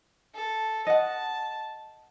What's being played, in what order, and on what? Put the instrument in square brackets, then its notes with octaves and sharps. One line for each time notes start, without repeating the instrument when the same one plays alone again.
[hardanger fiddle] A4
[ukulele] D#5 F#5 [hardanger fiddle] A5